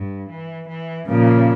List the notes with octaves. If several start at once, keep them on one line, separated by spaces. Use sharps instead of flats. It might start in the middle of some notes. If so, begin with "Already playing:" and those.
Already playing: G2
E3
E3
A#2 C#3 F3 A#3